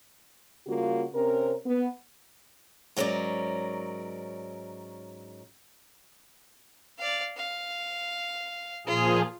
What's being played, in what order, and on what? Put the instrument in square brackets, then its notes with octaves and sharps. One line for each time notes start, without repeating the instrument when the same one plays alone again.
[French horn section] C#3 G3 A#3 F4 F#4
C3 C4 C#4 A#4
B3
[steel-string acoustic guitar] G#2 F#3 C#4 A#4 D5
[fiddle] D5 F5
F5
[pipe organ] A#2 F3 G#4 [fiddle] F4